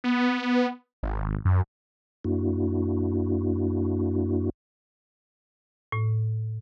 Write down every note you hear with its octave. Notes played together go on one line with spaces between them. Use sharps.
B3
G#1
F#2
F#2 A#3 D4 E4 F#4
A2